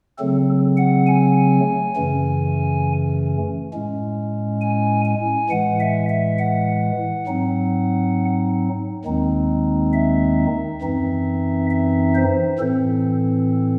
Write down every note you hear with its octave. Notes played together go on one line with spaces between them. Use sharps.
C#3 F#3 A3 C4 A4
F#5
G#5
F#2 C#3 E3 A3 C#4
A2 G#3 C#4
G#5
G#5
A2 E3 G#3 F#5
E5
E5
F#5
G#2 F#3 C4 D#4
D#2 D#3 G#3 C4 D#4
E5
F#2 E3 C4 D#4
E5
C5
A2 E3 C4 A4